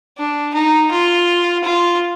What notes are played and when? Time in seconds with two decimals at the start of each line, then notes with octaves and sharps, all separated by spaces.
0.18 D4
0.54 D#4
0.91 F4
1.64 F4